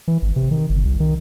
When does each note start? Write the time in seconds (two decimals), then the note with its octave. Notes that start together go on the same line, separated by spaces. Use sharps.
0.08 E3
0.22 G#1
0.36 C3
0.51 D#3
0.69 G1
0.85 C2
1.00 D#3